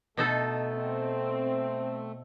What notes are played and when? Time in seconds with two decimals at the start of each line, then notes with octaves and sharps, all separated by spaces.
0.17 B2 A3 D#4 A4
0.73 C4